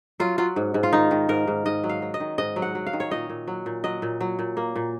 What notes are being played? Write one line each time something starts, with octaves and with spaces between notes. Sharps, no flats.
F#3 F4
F#3 F4
G#2
G#2
F4
D#3 D#4
D#3
G#2 A#4
G#2
G#2 D#5
F#3
F5
F#3
D#5
D#3
G#2 D#5
F#3
F#5
F#3
F5
D#3
C#5
A#2 D#5
A#2
F#3
A#2
F#3 D#5
A#2
F#3
A#2
A#3
A#2